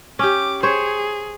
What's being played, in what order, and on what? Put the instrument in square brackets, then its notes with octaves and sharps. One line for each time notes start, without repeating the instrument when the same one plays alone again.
[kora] C#4 G4 [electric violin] D6
[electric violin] G#4 [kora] C5 C#5